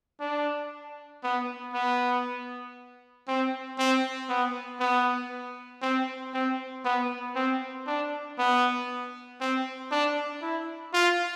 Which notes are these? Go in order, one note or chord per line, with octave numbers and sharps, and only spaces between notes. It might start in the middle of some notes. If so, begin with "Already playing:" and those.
D4
B3
B3
C4
C4
B3
B3
C4
C4
B3
C4
D4
B3
C4
D4
E4
F4